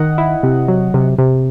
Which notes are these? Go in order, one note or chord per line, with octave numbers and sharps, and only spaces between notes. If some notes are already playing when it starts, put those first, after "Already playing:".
Already playing: D#3 D#5 F#5
E4
C3
F#3
C3
C3